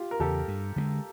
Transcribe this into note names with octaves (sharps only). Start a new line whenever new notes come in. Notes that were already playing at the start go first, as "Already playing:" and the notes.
Already playing: F4 G4
A#4
E2 C#3 G4 A4
G2
D3 F3 G#3